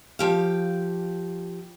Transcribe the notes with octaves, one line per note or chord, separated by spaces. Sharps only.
F3 G4 F5